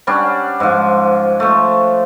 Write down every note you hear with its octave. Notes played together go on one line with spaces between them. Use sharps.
G3 C#4 D4 F#5
G#2 F3
F3 A3